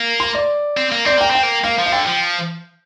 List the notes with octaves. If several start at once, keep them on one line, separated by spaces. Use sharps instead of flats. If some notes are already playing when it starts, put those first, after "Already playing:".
Already playing: A#3
C6
D5
C4
A#3
C4 D5
A#3 G5
C4 G5
A#3
A#3 F5
F3
F5
D3 G5
F3